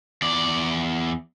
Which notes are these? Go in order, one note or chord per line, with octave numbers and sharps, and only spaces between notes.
E2 D5